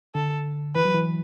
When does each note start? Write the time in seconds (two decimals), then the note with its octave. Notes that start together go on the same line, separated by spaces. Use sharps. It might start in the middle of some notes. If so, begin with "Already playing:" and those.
0.15 D3 A4
0.75 E3 B4
0.85 F#3
0.95 E3